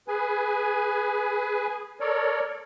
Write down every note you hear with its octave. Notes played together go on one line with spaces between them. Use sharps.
G#4 B4 G#5
A4 A#4 C#5 D5